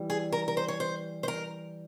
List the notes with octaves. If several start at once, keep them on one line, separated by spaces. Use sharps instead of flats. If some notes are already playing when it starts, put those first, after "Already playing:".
Already playing: E3 G3
G#4
A#4
A#4
C5
C#5
C5
C5
A#4